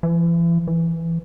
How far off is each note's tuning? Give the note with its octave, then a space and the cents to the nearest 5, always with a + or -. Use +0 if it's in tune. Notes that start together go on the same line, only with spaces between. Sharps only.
E3 +40
E3 +10